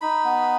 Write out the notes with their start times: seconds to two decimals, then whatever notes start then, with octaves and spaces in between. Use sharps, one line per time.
0.01 D#4 B5
0.25 B3